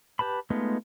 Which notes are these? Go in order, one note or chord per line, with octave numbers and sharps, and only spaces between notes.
G4 B4 A5 B5
G#3 A3 B3 D#4 F4